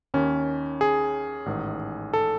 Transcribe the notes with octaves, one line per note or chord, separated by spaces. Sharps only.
D#2 D#3 C#4
G#4
A1 G#2 D#3
A4